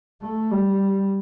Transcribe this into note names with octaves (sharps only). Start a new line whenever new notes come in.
A3
G3